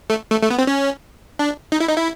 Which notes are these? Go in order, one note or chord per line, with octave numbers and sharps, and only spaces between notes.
A3
A3
A3
B3
C4
C#4
D4
D#4
E4
D#4
E4